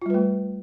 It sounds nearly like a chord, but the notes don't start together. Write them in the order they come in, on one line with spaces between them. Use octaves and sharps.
F4 G3 B4 A3